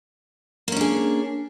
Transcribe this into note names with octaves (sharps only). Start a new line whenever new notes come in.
A#3 C#4 D4 G#4